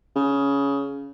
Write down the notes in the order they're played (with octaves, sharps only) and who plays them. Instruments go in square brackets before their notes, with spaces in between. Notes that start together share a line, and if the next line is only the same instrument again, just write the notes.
[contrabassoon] C#3